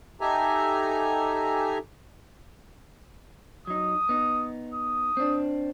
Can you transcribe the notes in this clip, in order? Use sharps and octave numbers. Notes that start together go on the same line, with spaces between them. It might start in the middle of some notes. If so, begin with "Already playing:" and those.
D#4 G4 A4 E5 G#5 A#5
F#3 D#4 D#6
B3 D#4
D#6
C4 D4